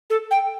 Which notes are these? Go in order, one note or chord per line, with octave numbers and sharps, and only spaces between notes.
A4
G5